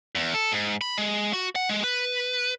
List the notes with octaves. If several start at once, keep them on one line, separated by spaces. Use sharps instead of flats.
E2
A4
G#2
B5
G#3
F#4
F#5
G#3
B4